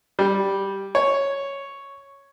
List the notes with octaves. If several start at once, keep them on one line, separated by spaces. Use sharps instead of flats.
G3
C#5